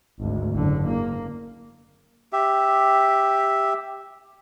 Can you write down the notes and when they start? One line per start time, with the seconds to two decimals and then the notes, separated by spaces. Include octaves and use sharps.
0.19 G#1 D2
0.51 F#1 D3
0.88 A#3
2.33 G4 E5